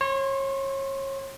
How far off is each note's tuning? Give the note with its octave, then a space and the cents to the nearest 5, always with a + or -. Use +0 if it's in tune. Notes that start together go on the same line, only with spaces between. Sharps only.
C#5 -30 C6 +0